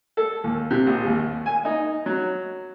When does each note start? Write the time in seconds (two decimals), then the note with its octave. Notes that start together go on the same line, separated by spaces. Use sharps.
0.17 A4
0.44 D#2
0.70 C3
0.86 A#1
1.06 D#2
1.46 G#5
1.65 D#4
2.06 F#3